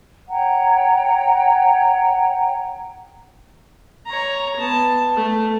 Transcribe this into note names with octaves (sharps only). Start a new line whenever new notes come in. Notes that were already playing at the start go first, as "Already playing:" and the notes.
C#5 F#5 G5 A#5
C#5 A#5
B3 A5
A3